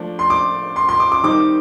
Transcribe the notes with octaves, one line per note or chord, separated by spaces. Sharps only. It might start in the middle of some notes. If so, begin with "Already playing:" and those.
Already playing: F3 A3 D4
C6
D6
C6
C6
D6
D6
D#3 G3 C4 D#4 D6